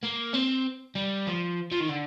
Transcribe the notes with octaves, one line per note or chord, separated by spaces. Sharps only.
A#3
C4
G3
F3
F3
D#3
D3